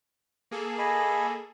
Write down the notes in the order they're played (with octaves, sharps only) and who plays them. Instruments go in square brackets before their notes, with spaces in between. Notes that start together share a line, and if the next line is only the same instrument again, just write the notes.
[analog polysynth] A#3 G#4 A4
[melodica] D#5 G#5 B5